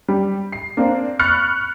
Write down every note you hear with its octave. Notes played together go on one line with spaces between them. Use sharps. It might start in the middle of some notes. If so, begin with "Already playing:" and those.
G3
C7
A#3 C4 D4
B5 C#6 F6 F#6 A6 C#7